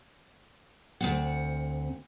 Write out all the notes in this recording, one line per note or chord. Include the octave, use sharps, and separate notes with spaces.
D2 C4 F#5